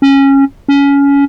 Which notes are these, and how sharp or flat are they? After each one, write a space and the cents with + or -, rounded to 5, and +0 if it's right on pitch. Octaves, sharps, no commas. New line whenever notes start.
C#4 -15
C#4 +20